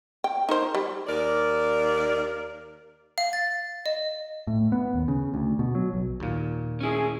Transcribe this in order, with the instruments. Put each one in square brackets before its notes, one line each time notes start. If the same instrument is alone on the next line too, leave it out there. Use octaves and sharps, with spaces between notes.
[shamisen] G5
D#4 A#4 C5
G3
[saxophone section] D#2 A#4 D5
[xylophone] F5
A6
D#5
[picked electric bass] A2
B3
D#2
C#3
D2
B2
F#3
B1
[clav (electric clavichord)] D#2 A#2
[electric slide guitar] C#4 E4 [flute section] G#4